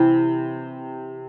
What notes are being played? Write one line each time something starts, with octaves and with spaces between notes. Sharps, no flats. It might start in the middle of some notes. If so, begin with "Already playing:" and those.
Already playing: C3 E3 E4